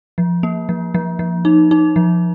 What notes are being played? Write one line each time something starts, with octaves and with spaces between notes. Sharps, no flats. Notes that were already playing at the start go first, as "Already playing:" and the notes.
F3
A#3
F3
F3
F3
D#4
D#4
F3